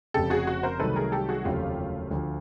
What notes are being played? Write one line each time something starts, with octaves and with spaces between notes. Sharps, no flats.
F1 F2 C#3 G4 A4
F#4 G#4
F#4
A#4 C5
C2 C3 D#3 F#3 A3 A4 B4
G#4 A#4
G4 A4
F#4 G#4
F1 D#2 C#3 F#3 A3 F4 G4
D2 D3 F3